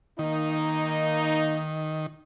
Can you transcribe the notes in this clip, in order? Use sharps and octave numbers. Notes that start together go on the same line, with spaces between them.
D#3 A#3 D#4